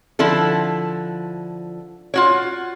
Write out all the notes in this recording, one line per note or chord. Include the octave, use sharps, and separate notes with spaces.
D3 F3 E4 A4
F4 F#4 C#5